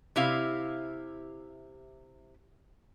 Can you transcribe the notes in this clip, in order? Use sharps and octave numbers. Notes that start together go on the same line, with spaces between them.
C3 E4 F5